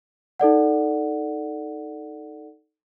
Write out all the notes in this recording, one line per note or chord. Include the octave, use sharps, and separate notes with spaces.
D#4 A4 D5 F#5